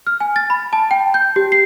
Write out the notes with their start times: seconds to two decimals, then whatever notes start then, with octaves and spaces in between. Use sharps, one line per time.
0.07 F6
0.20 G#5
0.36 A6
0.50 B5
0.73 A5
0.91 G5
1.14 G6
1.36 G4
1.52 C7